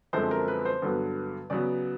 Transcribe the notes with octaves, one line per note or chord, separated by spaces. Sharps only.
F#2 D3 F3 G#3 C4 C5
A#4
B4
C5
G2 D3 F#3 B3
C#3 F#3 B3 D5